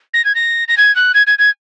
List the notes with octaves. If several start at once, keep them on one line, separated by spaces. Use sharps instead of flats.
A#6
G#6
A#6
A#6
G#6
F#6
G#6
G#6
G#6